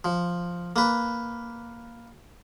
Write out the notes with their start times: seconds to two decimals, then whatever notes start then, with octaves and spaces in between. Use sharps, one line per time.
0.05 F3
0.76 A#3 B4